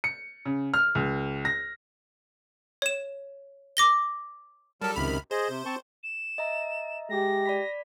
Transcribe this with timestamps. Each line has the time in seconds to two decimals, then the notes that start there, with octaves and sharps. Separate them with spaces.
0.04 C#7
0.45 C#3
0.74 F6
0.95 C#2
1.45 A#6
2.82 C#5 E7
3.77 D6 A#6 G7
4.82 F#3 G3 A4 A#4 A5
4.96 C#2 F#2 C3 D#3 B5 F6
5.31 G#4 C5 D#5
5.49 C3
5.65 C4 A5 C#6
6.04 E7
6.38 D#5 E5 A#5
7.10 G#3 G4 A#6
7.46 D5 B5 B6